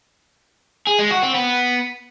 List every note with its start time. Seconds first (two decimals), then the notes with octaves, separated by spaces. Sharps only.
0.87 G#4
0.99 G#3
1.11 F#4
1.22 C4
1.34 B3